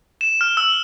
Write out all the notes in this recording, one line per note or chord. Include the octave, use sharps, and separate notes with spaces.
E7
F6
E6